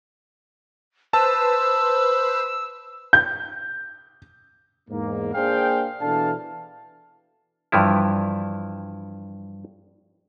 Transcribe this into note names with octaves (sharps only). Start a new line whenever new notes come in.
B4 C5 A5 E6
G6
E2 G#2 A#3
A#3 D4 G#4 C5 F5 G5
B2 E3 D4 A4 F5 A5
G2 E3 F3 E4